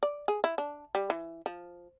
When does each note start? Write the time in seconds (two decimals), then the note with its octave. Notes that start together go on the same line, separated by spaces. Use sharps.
0.03 D5
0.28 G#4
0.44 E4
0.58 D4
0.95 G3
1.10 E3
1.46 F3